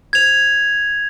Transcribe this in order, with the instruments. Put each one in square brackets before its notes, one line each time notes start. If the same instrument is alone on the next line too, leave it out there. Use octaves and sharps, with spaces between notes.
[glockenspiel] G#6 F7